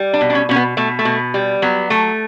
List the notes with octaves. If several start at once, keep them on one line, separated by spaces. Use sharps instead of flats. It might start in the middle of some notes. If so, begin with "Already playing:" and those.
Already playing: G3
D4
B2
D4
C#4
B2 C#4
B3
B2 A3
A3
B2
G3
F#3 B3
A3